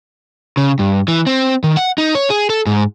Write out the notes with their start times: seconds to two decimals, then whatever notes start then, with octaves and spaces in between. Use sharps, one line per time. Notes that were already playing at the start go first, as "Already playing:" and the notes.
0.57 C#3
0.79 G2
1.08 E3
1.27 C4
1.64 D#3
1.77 F#5
1.98 D#4
2.15 C#5
2.30 G#4
2.50 A4
2.66 G#2